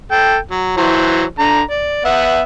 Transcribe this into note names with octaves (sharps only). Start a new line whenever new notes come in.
A4 G5
F#3
E3 F#3 C5
D3 A#5
D5
B3 E5 F#5